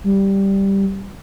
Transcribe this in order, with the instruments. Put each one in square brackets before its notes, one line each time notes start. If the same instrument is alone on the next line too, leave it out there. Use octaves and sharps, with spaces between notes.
[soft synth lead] G3